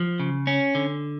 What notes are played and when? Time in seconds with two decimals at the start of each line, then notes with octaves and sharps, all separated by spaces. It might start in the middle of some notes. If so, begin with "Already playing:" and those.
Already playing: F3
0.20 C#3
0.47 C#4
0.75 D3